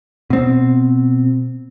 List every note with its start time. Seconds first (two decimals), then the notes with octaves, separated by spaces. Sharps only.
0.30 B2 C4